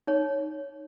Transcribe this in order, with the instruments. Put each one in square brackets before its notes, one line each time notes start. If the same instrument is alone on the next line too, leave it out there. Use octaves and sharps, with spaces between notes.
[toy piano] D#4 C#5